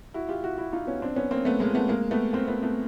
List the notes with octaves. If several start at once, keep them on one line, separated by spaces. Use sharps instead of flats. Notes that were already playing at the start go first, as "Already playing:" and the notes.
E4 F#4
F4 G4
E4 F#4
E4 F#4
D#4 F4
B3 C#4
C4 D4
B3 C#4
A#3 C4
A3 B3
G#3 A#3
A3 B3
G#3 A#3
A3 B3
A#3 C4
A3 B3
A3 B3